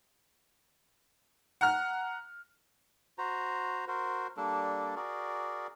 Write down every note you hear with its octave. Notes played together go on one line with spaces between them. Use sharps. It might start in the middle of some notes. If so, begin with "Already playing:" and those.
F#5 A#5 F6
F#4 C5 A#5
F#4 A#4 C5
G3 A#3 D4 A4
F#4 G#4 A#4 D5